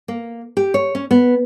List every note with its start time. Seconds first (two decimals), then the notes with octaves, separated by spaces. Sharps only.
0.08 A#3
0.57 G4
0.74 C#5
0.95 C#4
1.11 B3